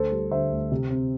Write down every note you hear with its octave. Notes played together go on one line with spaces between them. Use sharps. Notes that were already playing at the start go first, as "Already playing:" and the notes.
Already playing: D2 A4 C5
G3
D3 C5 E5
D2
C3
C4